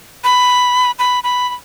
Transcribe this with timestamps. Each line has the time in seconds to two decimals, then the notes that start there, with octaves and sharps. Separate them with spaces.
0.24 B5
0.99 B5
1.24 B5
1.49 B5